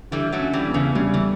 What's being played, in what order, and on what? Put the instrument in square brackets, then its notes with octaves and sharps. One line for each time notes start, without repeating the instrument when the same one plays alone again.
[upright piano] D3 [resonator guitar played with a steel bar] E3 G3
[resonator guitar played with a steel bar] F#3 A3
[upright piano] C#4
[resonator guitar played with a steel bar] E3 G3
[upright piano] E2
[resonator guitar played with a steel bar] C#3 E3
[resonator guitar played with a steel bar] C#3 [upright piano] G3
[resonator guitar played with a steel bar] E3